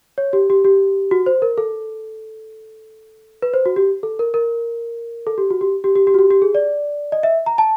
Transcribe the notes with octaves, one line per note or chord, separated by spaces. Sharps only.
C#5
G4
G4
G4
F#4
C5
A#4
A4
B4
C5
F#4
G4
A4
A#4
A#4
A4
G4
F#4
G4
G4
G4
G4
F#4
G4
G4
G#4
D5
D#5
E5
A#5
A5